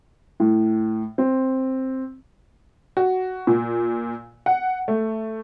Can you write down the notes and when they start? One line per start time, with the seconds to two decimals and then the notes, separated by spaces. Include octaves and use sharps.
0.40 A2
1.18 C4
2.97 F#4
3.47 A#2
4.46 F#5
4.88 A3